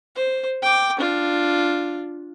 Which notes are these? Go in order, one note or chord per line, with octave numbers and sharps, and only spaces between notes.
C5
G5 D6
D4 F4